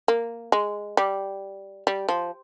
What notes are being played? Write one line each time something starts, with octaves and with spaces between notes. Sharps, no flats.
A#3
G#3
G3
G3
F3